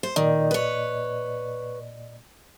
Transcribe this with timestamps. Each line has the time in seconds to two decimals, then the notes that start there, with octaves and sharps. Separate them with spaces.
0.03 C5
0.16 A#2 D#3 D5 D#5
0.51 B4 C#5